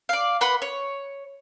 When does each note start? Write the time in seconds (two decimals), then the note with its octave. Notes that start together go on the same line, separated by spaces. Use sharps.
0.09 D5 F5
0.41 B4 F#5 B5 C6
0.62 C#5